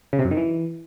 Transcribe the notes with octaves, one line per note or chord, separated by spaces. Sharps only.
C#3
C3
F#2
D#3
E3